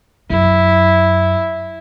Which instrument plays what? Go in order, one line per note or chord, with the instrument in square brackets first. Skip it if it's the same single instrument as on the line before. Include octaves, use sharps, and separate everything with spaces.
[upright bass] F#2 [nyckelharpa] E4